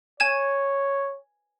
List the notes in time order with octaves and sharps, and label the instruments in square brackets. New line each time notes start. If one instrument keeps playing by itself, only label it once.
[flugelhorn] C#5 [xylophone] G#5 G#6 E7